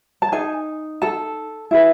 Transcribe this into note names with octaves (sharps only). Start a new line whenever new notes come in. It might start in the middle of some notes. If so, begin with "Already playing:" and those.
A5
D#4 G#4 G#5
A4 A5
E4 G#4 B4